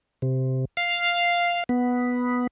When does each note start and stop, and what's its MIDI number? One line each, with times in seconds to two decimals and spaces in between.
0.22 0.65 48
0.77 1.64 77
1.69 2.47 59